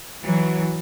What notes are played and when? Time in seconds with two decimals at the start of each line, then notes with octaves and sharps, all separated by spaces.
0.23 E3 F#3